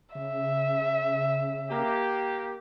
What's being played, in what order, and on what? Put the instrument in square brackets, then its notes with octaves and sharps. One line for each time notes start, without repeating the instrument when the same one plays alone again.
[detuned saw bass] C#3 [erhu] E5
[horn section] A#3 G4